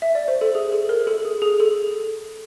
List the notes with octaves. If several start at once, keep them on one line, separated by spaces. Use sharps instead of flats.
E5
D5
C5
A4
G#4
A4
A#4
A4
G#4
G#4
A4